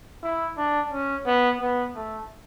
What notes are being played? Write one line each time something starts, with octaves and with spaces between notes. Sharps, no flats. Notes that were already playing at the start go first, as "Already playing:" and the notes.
E4
D4
C#4
B3
B3
A3